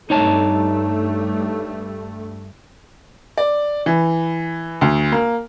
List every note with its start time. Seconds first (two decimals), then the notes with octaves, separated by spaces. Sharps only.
0.10 G2 A3 D#4 C#5 A5
3.38 D5
3.86 E3
4.81 D2
5.12 A#3